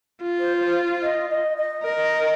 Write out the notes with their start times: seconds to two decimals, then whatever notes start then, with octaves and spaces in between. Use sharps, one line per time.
0.21 F4
0.39 C5
0.57 C5
1.02 D#5
1.29 D#5
1.56 D#5
1.83 A#4 D#5